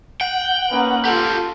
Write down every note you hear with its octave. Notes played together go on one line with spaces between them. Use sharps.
F#5 G5
A#3 C#4 D#4 B4
F4 G4 A4 A#4